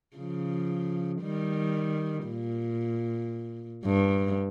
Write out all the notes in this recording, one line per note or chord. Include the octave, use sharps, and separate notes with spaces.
C#3 F3
D#3 G3
A#2
G2